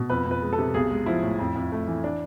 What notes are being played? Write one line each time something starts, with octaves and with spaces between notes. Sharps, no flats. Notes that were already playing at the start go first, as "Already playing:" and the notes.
Already playing: B2
F2 B4
F2
B4
G#3
A4
C3
B1 G#4
G#3
F3 E4
A2
F2
F2
A3
E3
D4